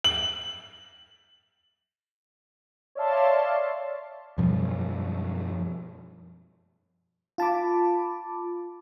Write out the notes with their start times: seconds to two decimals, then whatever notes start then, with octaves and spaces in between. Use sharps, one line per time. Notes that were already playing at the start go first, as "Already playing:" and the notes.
0.04 F#7
2.95 C#5 D5 E5 F5 A5 C6
4.38 F#2 B2 F3 G3
7.38 F4 A5 B5 D6